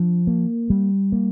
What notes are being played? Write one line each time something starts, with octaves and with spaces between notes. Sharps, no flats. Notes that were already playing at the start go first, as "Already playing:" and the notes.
Already playing: F3 D4
A#3
G3
A#3